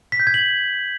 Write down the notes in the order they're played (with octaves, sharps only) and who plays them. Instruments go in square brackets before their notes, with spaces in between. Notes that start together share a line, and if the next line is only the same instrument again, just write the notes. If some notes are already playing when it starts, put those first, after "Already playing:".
[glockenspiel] B6
G6
G#6
F#7